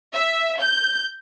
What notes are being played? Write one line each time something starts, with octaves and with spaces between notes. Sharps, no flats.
E5
G6